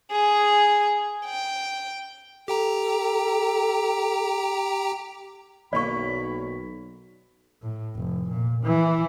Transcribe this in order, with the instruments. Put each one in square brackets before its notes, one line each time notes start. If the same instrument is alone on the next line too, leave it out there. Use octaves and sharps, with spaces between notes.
[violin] G#4
G5
[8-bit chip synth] G4 G5 A#5 [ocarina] A4
[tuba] B1 [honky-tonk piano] D#3 A#3 C#5 [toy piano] D5 C#6 [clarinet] B5
[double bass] A2
F1
A#2
E3